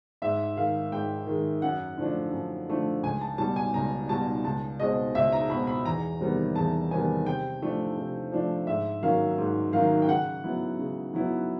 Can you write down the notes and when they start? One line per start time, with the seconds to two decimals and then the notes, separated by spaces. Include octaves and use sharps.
0.22 G#2 E5
0.57 D#3 G#3 F5
0.92 G#2 G5
1.27 D#3
1.32 G#3
1.62 F#2 F#5
1.98 D3 F3 A3 D4
2.33 F#2
2.68 D3 F3 A3 D4
3.03 C#2 G#5
3.21 A5
3.38 B2 G3 A5
3.56 G#5
3.74 C#2 A#5
4.09 B2 G3 A5
4.44 C#2 A5
4.80 B2 G#3 C4 D#5
5.15 C#2 E5
5.32 A#5
5.50 B2 B5
5.53 G#3 C4
5.67 B5
5.85 E2 A#5
6.20 C3 D#3 G3 B3
6.56 E2 A5
6.91 C3 D#3 G3 B3 G#5
7.26 C3 G5
7.62 F3 A3 D4
7.97 C3
8.32 F3 A3 D4
8.67 G#2 E5
9.02 D#3 F#3 A#3 C#4 F5
9.38 G#2
9.72 D#3 F#3 A#3 C#4 F5
10.02 G5
10.08 C#3 F#5
10.43 F#3 B3 E4
10.79 C#3
11.14 F#3 B3 E4